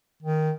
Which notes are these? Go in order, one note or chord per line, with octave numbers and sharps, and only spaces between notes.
D#3